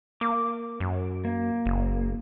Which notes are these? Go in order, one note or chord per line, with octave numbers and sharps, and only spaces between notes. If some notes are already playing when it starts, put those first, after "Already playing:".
A#3 D6
F#2
A#3
F#1